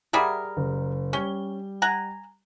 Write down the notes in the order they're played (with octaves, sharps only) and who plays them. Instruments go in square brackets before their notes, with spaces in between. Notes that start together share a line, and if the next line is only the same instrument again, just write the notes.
[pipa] G3 G#4 A#4 [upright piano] E5 F#5
[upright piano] F#1
[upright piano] G3 G7 [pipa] C#4
[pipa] F#5 G#5 A#5